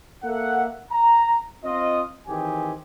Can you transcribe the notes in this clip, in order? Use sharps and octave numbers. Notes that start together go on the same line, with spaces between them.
A#3 A4 E5 F#5
A#5
C4 F4 D#5
D#3 E3 C4 G4 G#4 G#5